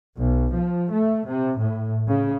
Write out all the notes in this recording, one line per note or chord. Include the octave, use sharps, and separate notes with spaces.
B1
F3
A3
C3
A2
C#3